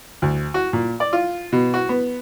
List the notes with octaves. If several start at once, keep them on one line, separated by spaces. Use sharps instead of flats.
D2
F#4
A#2
D5
F4
B2
F#4
B3